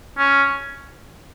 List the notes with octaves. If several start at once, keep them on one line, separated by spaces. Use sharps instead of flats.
C#4